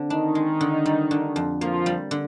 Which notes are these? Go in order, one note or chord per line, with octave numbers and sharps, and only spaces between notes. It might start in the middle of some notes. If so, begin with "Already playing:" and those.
Already playing: D3 C4
D#3 D4 D#4
G#3
D3
G3
D3
F2
F3 A#3 F4
G3
D3